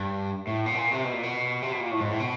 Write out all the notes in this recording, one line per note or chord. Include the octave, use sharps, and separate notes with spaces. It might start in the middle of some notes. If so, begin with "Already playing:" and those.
Already playing: G2
A2
A#2
B2
A#2
C3
B2
A#2
B2
C3
B2
A#2
A2
G#2
A2
B2